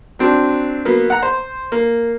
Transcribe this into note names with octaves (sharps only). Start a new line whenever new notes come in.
F#3 C4 D4
F#3 A#3 B3
F#5 A#5
C5
A#3